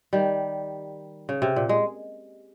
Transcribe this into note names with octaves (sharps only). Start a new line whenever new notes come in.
D#3 G3
C#3
C3
A#2
G#3